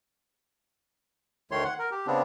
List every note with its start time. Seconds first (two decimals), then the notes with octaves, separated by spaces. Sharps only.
1.51 D2 D#3 A3 C#5 C6
1.65 F#5
1.79 A#4
1.91 G4
2.07 C#3 B3 C4 D4